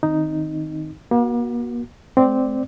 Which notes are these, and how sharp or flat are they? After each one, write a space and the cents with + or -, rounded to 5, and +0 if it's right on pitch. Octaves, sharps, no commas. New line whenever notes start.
D#3 +0 C4 +0 D#4 +0
A#3 +40 F#4 +0
A3 -45 C4 -10 D5 +0